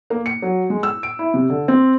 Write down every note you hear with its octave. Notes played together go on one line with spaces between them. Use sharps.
A#3
C#7
F#3
G#3
E6
D7
E4
C3
D3
C4